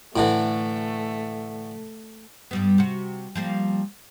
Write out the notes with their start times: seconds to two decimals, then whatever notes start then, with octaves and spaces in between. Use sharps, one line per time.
0.16 A2 D3 E3 A3
2.51 G2 G3 B3
2.78 C3 F#4
3.35 F3 G3 A#3